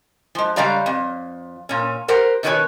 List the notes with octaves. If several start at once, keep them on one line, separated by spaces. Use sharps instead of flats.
F3 G#3
C#3 G3 G#3 D5 F5 A#5
F2
A#2 C#4
G4 A#4 C5 F#5
B2 D#3 F#3 A3 B4 C#5